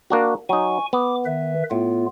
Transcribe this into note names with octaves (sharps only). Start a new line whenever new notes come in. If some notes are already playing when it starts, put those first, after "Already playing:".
A#3 D4 F#4
F#3 D#4 G#5 C#6
B3 D6
D#3 B4 E5
A2 B3 F4